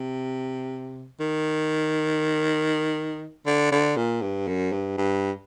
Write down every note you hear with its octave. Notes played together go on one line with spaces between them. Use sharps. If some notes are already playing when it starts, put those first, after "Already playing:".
Already playing: C3
D#3
D3
D3
A#2
G2
F#2
G2
G2